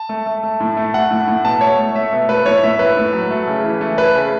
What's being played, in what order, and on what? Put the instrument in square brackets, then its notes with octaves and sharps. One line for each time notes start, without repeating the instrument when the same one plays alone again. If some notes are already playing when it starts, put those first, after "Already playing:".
Already playing: [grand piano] A5
A3
A3
A3
A2
A3
A3 F#5
A2
A2
B2 A5
A3 C#5
A3
A3 E5
B2
A3 B4
A2 C#5
A2 E5
A2 B4
A2
F#3
A3
C#3
E3
A3
A3 B4
C#3